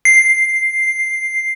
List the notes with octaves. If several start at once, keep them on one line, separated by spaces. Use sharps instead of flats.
C7